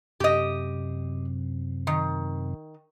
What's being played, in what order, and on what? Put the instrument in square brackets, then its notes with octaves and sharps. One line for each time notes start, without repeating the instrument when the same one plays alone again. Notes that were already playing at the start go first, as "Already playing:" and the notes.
[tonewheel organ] F#2 C3 [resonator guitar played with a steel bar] G4 D#5
[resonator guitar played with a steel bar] D#3